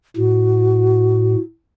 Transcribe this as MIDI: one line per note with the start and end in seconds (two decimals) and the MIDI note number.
0.17 1.36 45
0.17 1.40 66